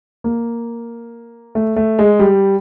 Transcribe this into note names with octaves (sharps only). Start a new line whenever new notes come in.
A#3
A3
A3
G#3
G3